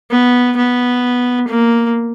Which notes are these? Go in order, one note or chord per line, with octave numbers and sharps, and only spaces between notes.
B3
B3
A#3